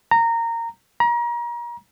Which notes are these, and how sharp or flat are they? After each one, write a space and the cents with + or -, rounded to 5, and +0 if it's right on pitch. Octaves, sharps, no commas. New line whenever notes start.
A#5 -15
A#5 +35